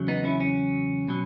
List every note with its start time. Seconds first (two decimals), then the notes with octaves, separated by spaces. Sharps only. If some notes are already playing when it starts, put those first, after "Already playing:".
Already playing: E2 C#3 F#3
0.08 B3 D#4
0.24 C#4 E4
0.40 C#4
1.08 B2 F#3